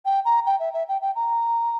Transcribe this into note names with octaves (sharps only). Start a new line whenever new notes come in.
G5
A#5
G5
E5
E5
G5
G5
A#5